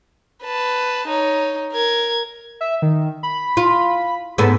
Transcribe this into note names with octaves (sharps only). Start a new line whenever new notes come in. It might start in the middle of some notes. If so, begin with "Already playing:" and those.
B4 A5
D#4 C#5
A#4 G#6
E5
D#3
B5
F4
G#2 B3 A4